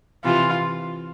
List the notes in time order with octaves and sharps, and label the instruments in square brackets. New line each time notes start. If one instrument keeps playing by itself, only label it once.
[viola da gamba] C3 E3 [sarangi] F4